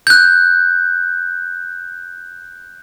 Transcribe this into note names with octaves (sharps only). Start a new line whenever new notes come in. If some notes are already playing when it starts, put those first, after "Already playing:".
F#6 G6